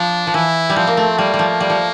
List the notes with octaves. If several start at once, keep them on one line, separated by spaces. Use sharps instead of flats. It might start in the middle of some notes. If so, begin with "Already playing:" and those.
Already playing: F3 D4
F3
E3 E4
G3
F3 C4
A#3
A3
G3 A#3
G3
F3
G3
F3